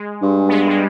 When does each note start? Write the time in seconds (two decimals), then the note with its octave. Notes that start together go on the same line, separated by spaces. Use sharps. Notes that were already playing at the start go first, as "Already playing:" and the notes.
Already playing: G#3
0.22 G2
0.48 B3
0.53 G#3
0.67 G3